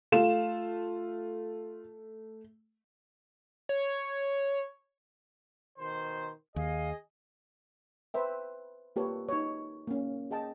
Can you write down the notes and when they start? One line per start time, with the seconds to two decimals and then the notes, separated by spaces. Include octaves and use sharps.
0.12 A3 F4 E7
3.69 C#5
5.79 B2 D#3 C5 C6
6.56 D#2 G#4 D#5 F5
8.14 B4 C5 E5 G5
8.96 A#3 F4 G4 A4 B4 C#5
9.29 D#4 C#5
9.87 A#3 C#4
10.31 G#4 D#5 G5 A5